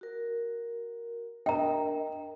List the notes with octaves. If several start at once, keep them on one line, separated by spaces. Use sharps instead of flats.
F#4 A#4
D4 A#4 D#5 G5 A#5